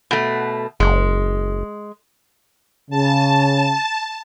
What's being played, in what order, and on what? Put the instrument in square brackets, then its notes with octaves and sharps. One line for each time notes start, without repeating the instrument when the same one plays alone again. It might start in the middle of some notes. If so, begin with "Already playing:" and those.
[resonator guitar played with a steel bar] B2 A3
[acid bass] F#1 [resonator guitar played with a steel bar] G#3
[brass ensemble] C#3 [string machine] A5